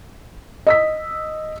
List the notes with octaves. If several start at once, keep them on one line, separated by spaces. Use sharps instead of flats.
D#5 E6 B6